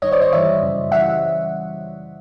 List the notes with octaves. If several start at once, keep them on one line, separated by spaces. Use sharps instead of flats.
G#1 G2 D#3 C#5 D#5
C5 D5
C#5 D#5
G#1 G2 E3 G3 D5 E5
F#2 C#3 F#3
C#3 E3 G3 E5 F#5